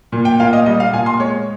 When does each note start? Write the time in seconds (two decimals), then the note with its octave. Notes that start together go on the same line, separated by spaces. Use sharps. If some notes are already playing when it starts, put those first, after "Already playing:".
0.12 A#2
0.25 G5
0.40 A#2 F5
0.53 D#5
0.66 G3 D#5
0.80 F5
0.93 A#2 G#5
1.06 C6
1.20 G#3 C#5